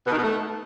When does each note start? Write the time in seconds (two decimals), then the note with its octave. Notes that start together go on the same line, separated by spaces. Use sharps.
0.06 B2
0.12 D#3
0.18 B2
0.23 A3